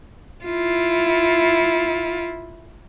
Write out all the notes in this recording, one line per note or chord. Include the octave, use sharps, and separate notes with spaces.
E4 F4